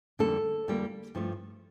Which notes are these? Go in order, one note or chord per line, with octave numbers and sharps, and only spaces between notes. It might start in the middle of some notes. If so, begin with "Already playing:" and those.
F2 D3 G3 A#3 A4
F2 D3 G3 A#3
G2 F3 A3